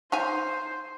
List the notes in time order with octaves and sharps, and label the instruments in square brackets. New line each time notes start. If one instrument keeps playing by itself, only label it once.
[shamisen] D#4 F5 G#5 [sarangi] C5